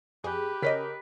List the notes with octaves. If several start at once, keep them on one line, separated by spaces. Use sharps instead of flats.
F2 G4 G#4 B4
C#3 C#4 A#4 D#5 B6